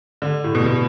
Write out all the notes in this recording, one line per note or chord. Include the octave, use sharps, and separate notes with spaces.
D3
A2
B2
B2